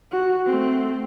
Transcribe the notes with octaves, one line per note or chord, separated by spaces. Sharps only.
F#4
A3 C4